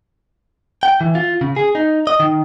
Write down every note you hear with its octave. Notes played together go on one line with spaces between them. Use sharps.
G5
E3
F4
C#3
G#4
D#4
D#5
D#3